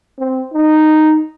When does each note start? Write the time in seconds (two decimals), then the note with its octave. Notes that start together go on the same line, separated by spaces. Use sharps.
0.19 C4
0.53 D#4